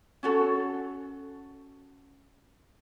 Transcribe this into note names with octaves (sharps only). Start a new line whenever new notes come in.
C#4 F#4 A4